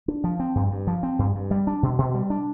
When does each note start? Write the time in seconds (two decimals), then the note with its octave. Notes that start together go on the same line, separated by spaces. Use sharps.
0.08 D4
0.24 F3
0.40 C4
0.55 G2
0.72 G2
0.87 F3
1.03 C4
1.19 G2
1.35 G2
1.51 G3
1.67 D4
1.83 B2
1.98 B2
2.14 G3
2.30 D4